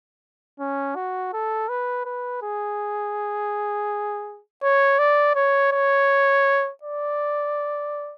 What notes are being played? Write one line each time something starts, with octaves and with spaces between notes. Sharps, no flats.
C#4
F#4
A4
B4
B4
G#4
C#5
D5
C#5
C#5
D5